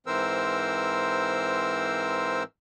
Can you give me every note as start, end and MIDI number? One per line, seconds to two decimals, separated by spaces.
0.07 2.43 44
0.07 2.43 52
0.07 2.43 60
0.07 2.43 70
0.07 2.43 72
0.07 2.43 88